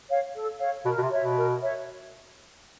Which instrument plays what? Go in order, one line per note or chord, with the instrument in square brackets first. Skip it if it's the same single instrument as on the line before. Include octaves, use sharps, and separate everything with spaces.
[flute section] C#5 F5
A4
C#5 F5
[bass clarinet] B2 [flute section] A#4
[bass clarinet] B2
C3
[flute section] C#5 E5
[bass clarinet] B2
[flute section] A#4
C#5 E5